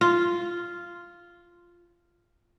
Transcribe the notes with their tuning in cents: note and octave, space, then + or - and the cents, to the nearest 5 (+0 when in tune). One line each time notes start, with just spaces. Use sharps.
F4 -5